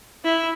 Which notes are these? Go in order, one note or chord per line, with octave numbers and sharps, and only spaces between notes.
E4